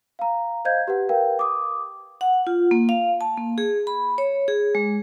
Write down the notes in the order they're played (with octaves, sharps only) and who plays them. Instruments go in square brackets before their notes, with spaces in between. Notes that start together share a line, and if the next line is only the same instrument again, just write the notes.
[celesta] F5 A#5
C5 D#5 F5 G6 G#6
G4 B4 F#5
A#4 B4 F5 G5
D6 D#6
[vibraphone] F#5
F4
A#3
F5
A5
A#3
G#4
B5
C#5
G#4
G#3